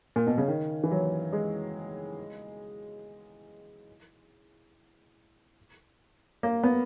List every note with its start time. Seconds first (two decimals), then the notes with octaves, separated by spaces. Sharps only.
0.16 A#2
0.27 B2
0.38 C#3
0.48 D#3
0.84 E3
0.91 F#3
1.33 G#3
6.43 A#3
6.64 B3